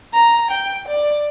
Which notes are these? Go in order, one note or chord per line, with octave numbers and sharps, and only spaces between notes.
A#5
G5
D5